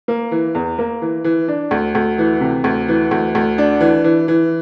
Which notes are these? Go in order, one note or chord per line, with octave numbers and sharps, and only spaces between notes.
A#3
E3
E2
A#3
E3
E3
D4
D2
D2
E3
C3
D2
E3
D2
D2
D4
E3
E3
E3